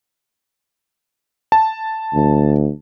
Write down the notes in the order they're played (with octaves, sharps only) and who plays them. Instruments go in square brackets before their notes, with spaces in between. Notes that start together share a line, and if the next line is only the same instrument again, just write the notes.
[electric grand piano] A5
[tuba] D2